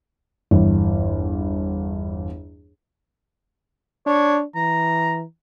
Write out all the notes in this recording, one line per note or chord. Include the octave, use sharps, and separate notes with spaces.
G1 E2
D4 C#5
E3 A#5